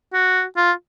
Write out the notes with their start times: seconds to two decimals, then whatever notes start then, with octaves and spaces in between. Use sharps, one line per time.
0.14 F#4
0.57 F4